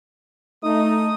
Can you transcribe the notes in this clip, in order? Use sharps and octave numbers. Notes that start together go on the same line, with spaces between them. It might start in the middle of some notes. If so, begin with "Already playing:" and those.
A3 D#4 D#6